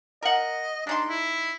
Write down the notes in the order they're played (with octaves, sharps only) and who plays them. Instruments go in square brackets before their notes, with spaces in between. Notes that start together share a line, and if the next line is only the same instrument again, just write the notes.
[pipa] A#4 F#5 [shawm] D#5
[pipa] G#3 D#4 C6 [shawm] D4
[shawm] E4